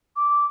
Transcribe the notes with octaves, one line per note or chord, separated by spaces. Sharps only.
D6